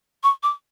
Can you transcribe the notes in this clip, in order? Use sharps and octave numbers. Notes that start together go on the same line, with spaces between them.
C#6
D6